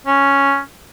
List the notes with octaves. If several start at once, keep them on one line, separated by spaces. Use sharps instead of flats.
C#4